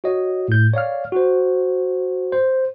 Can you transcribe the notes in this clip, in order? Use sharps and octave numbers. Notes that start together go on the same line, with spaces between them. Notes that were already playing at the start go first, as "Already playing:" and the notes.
F#4 C#5 D#5
A2 G6
C#5 D5 F5 F6
F#4 C5
C5